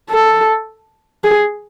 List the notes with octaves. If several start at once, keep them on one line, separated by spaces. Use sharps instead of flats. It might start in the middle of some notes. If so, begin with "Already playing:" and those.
A4
G#4